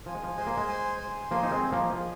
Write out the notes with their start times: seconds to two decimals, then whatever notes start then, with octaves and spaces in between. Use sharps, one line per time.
0.06 F3 G#5
0.15 G#3
0.23 F3
0.38 G#3 C5
0.47 A#3
0.57 G#3
0.68 G#5
0.99 C5
1.31 F3 A#3 G#5
1.43 D#4
1.51 G#3 C4
1.62 D#5
1.72 F3 A#3
1.94 F3 G#4